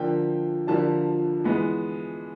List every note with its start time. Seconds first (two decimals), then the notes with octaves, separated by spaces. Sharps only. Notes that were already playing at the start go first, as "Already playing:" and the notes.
Already playing: D3 F3 A#3 G5
0.67 D3 F3 A#3 A5
1.44 E3 G#3 B3